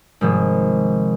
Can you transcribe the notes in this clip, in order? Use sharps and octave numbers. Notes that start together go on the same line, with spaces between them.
G#1 C3 F3